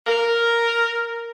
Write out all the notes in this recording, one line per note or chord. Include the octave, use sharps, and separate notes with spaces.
A#4